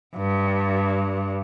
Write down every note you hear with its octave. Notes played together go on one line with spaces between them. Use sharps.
G2